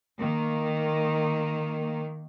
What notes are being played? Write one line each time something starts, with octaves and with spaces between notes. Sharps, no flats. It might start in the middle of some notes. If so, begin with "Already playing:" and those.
D#3 A#3